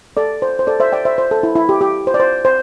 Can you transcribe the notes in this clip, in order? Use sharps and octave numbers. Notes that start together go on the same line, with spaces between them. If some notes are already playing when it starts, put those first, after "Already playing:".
A4 D5
C5
C5
A4 D5
C5 E5
D5 G5
C5 E5
C5
A4
E4
E4
G4
G4
C5
D5
C5
C5